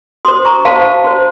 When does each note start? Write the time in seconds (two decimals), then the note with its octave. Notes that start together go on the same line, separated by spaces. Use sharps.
0.25 F#4 C5 C6 D#6
0.45 A#5 C#6
0.65 F#4 C5 F5 A5
1.04 F#4 C5